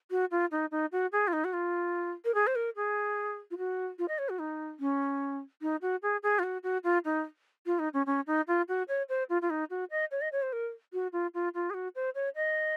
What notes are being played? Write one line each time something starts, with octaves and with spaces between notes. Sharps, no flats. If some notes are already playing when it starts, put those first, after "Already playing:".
F#4
F4
D#4
D#4
F#4
G#4
F4
D#4
F#4
F4
A#4
G#4
C5
A#4
G#4
F4
F#4
F4
D#5
C#5
F#4
D#4
C#4
D#4
F#4
G#4
G#4
F4
F#4
F#4
F4
D#4
F4
D#4
C#4
C#4
D#4
F4
F#4
C#5
C5
F4
F4
D#4
F#4
D#5
C#5
D#5
C#5
C5
A#4
F#4
F4
F4
F4
G#4
F#4
C5
C#5
D#5